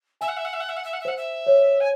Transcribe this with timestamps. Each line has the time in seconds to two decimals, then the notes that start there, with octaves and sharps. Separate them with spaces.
0.21 E5 G#5
0.28 F#5
0.37 E5
0.45 F#5
0.53 E5
0.60 F#5
0.69 E5
0.77 F#5
0.84 E5
0.93 F#5
1.01 E5
1.05 C5 F#5
1.17 E5
1.47 C#5
1.80 G#5